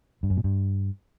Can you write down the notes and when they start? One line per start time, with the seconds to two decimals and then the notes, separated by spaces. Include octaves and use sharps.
0.23 G2
0.30 F#2
0.37 A#2
0.44 G2